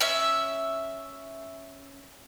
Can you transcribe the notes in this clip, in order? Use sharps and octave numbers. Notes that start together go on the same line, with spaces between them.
C#4 E5